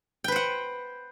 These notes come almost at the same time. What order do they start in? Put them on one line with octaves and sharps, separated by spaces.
G5 B4 C5 F#5